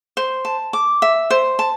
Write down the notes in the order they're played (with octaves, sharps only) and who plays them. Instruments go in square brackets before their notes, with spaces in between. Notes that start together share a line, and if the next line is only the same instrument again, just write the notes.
[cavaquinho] C5
A5
D6
E5
C5
A5